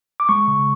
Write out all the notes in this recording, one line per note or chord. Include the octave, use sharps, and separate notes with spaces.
D6
G#3 C#6
C#3